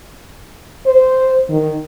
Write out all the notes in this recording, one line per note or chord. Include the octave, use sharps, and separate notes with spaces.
C5
D#3